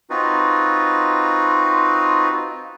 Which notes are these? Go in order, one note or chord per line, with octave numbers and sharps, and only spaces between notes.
C4 D#4 F4 F#4 B4